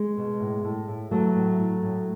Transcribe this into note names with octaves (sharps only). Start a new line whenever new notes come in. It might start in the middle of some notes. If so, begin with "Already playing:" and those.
Already playing: G#3
B2
A2
A2
A2
E3 F#3 A3
A2
A2
A2